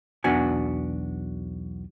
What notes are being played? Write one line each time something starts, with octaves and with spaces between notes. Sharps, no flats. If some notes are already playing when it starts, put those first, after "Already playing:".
B1 E2 B3 D4 F#4 G#5